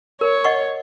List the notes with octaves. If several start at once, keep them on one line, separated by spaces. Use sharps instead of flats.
A#4 C#5
D#5 F#5 C#6